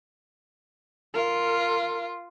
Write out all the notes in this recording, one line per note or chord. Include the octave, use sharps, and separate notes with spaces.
F4 A#4